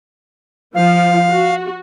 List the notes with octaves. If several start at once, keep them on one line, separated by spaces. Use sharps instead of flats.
F3 F5
F#4